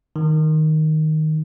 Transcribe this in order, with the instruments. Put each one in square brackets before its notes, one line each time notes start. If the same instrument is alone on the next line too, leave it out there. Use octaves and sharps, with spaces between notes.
[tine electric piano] D#3